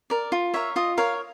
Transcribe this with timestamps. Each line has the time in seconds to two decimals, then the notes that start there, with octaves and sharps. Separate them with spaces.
0.10 A#4 D5
0.32 F4
0.54 A#4 C#5 E5
0.76 F4 D#5
0.98 A#4 C#5 F5